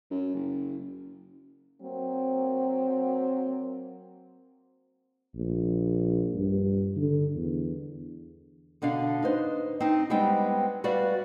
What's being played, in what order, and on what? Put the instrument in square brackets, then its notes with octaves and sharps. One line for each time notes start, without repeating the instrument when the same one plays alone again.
[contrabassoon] F#2
F#1
[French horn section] F#3 A#3 C4
[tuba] A#1
G2
D3
E2
[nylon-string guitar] B2 D3 D4 F5
D#4 B4 C5
C4 D#4
G3 G#3 B3 C4 C5 G5
G3 F#4 B4 D5 F5